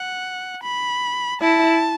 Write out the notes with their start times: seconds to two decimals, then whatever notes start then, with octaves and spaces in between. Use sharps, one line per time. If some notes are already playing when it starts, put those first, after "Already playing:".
Already playing: F#5
0.63 B5
1.42 E4 A5